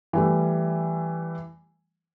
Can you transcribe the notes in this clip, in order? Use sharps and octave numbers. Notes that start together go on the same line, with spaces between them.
E3 G3 A3